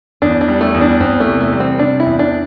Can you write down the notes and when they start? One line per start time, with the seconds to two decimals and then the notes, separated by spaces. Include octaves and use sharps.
0.22 E2 D4
0.41 D4
0.48 G3
0.61 A3
0.74 E2
0.81 D4
1.00 E2 C4
1.20 A3
1.27 C3
1.41 A3
1.53 G3
1.60 C4
1.79 C3 D4
2.00 E4
2.06 E2
2.19 D4